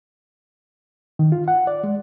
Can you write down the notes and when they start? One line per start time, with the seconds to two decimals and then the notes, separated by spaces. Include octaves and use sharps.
1.19 D#3
1.32 F4
1.48 F#5
1.67 D5
1.84 G#3